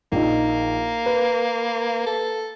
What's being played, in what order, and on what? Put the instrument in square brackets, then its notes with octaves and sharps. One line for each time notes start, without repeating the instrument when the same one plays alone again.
[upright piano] A#1 D#4 [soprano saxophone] A#3
[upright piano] B4
[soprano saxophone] A4